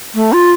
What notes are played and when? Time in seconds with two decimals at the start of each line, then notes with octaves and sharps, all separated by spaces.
0.15 A3
0.33 F4